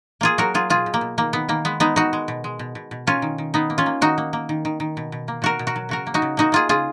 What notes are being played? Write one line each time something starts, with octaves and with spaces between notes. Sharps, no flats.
A#3 F4 G#4
F#3 F#4 A#4
F#3 F4 G#4
B2 F4 G#4
B2
A#3
B2
D#3 A#3
D#3 B3
D#3 A#3
G#3 B3
G#3 B3 D#4
D#3 D#4 F#4
G#3
B2
G#3
B2
B2
B2
A#3 C#4 F4
D#3
D#3
D#3 B3 D#4
A#3
C#4 F4
A#3
D#3 D#4 F#4
A#3
A#3
D#3
D#3
D#3
B2
B2
A#3
B2 F#4 A#4
B2
F#4 A#4
F#3
C#3 F#4 A#4
A#3
D#4 F#4
C#3
A#3 D#4 F#4
A#3 F4 G#4
C#3 F4 G#4